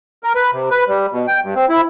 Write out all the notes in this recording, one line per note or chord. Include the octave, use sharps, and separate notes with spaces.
A#4
B4
C3
B4
G3
B2
G5
G2
C4
E4